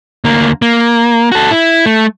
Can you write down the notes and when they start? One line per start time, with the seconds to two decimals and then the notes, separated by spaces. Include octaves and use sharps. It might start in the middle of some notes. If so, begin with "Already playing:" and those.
0.24 D2 A#3
0.62 A#3
1.32 F#4 A4
1.51 E4
1.86 A3